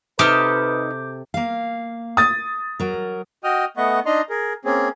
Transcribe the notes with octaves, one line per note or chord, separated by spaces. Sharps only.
C3 D#4 G4 A4 B4 D6 F6 G6
A#3 F5
D#6 A6
F#3 A#4
F#4 D#5 G5 D#6 F6
A3 B3 D#5 F#5 C#6
D4 D#4 D#5 A#5 C6
G#4 A#4
A#3 C4 C#4 G#4